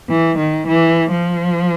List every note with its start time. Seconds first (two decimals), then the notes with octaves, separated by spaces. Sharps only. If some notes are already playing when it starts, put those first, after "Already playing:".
0.09 E3
0.38 D#3
0.67 E3
1.11 F3